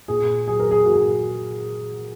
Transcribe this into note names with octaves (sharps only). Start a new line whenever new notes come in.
A#2 G#4
F#3 G#4
A#4
G#4
A#2 F#4
G#4